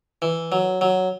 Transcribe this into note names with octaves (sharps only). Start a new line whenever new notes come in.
E3
F#3
F#3